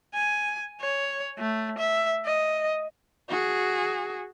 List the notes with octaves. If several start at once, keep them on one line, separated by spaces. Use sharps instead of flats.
G#5
C#5
A3
E5
D#5
F#4 G#4